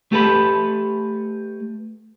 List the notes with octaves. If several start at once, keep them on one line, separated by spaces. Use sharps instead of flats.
A3 G4 A4 B4 B5